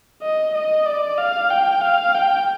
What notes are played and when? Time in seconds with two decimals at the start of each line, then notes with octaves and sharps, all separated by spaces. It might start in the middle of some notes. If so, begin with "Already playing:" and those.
0.22 D#5
0.55 D#5
0.86 D5
1.18 F5
1.51 G5
1.82 F5
2.15 G5